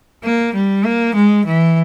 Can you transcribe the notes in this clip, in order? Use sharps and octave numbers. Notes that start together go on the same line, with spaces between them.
A#3
G3
A#3
G#3
E3